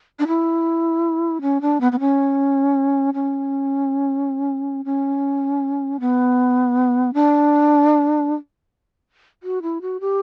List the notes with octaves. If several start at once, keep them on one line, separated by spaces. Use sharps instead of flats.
D4
E4
C#4
D4
B3
B3
C#4
C#4
C#4
B3
D4
F#4
E4
F#4
G4